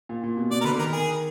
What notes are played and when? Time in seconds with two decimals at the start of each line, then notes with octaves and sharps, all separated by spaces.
0.09 A#2
0.24 A#2
0.37 B2
0.51 B2 D5
0.61 A#4
0.64 D3 B4
0.78 D#3 A#4
0.92 G#4